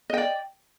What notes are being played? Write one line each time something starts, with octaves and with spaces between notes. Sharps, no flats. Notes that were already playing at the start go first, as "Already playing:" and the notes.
D5 D#5 G5